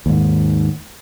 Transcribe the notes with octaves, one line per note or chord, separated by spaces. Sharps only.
D#2 G#2